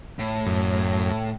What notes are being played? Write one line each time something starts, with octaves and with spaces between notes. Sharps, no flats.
A2
F#2